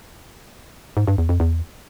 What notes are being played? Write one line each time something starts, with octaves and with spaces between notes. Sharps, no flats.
G#2
G2
E2
F2
E2